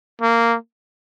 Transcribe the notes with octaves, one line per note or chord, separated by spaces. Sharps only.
A#3